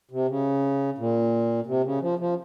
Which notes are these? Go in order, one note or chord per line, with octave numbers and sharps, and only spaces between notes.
C3
C#3
A#2
C3
C#3
F3
F3